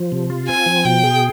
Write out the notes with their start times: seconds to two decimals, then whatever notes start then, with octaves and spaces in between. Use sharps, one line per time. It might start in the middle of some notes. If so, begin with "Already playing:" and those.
Already playing: F3
0.12 C3
0.30 F4
0.49 C4 G#5
0.66 F3
0.85 B2 G5
1.03 G#4